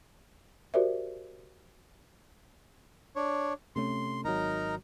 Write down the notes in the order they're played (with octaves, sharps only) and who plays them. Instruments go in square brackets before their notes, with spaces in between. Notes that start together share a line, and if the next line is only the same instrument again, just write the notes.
[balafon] F#4 G4 A#4 C5 D5 E5
[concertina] D4 C#5
[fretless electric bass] C3 A3 C#4 [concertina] C6
[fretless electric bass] G#1 F#3 [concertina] D#4 A#4 A#5